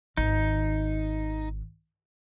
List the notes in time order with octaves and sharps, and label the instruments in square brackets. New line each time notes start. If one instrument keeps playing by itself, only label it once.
[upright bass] G#1 D#3 [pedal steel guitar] D#4